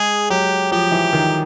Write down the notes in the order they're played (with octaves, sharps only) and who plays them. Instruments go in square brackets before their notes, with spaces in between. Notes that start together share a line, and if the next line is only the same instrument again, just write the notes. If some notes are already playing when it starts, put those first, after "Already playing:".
Already playing: [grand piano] G#3 [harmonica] G#4
[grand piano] F#3 [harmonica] G4
[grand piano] F3 [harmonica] G4
[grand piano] E3
D#3